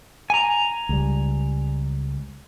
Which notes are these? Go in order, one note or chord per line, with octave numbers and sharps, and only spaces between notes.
G#5 A#5
C#2 G3